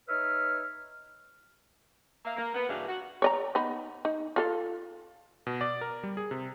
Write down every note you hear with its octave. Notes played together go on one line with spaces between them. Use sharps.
D#4 B4 C#5 E5 F6
A#3 E5 F5
A#3
B3
G2 C#3 E3 D4 F#4 F5
F#4
C#5 D5 A#5
B3 D#4 B5
D#4
F4 A4 F5
B2
D5
A#4
G3
G#4
C3